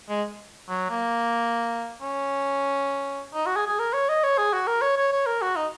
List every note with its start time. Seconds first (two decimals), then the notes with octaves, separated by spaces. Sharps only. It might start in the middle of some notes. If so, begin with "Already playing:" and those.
0.09 G#3
0.69 F#3
0.90 A#3
2.02 C#4
3.34 D#4
3.46 F#4
3.56 G#4
3.67 G#4
3.79 A#4
3.93 C#5
4.09 D#5
4.23 C#5
4.38 G#4
4.53 F#4
4.67 A#4
4.82 C#5
4.97 C#5
5.12 C#5
5.26 A#4
5.42 F#4
5.56 D#4